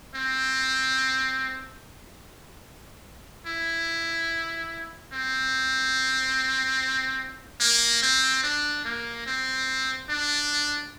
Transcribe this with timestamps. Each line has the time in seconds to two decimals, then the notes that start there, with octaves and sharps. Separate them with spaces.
0.15 C4
3.46 E4
5.12 C4
7.60 A#3
8.02 C4
8.43 D4
8.85 A#3
9.26 C4
10.09 D4